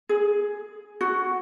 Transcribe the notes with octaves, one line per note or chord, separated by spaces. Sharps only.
G#4
F#4